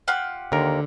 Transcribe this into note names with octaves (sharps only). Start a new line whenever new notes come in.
F4 G4 F#5
D#2 D3 A#4